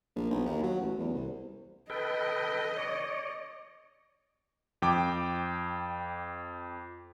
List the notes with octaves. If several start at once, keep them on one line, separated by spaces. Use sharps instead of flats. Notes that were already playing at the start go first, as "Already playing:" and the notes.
A#1
B1
D#2
F#3
A1
E2
C2
A4 B4 D#5 G5
C#5 D5
F2 G5 D6